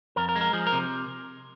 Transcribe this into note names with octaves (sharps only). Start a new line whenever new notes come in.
F2 A#4
A#4
G#3
A#4
F3 G#4
A#4
C3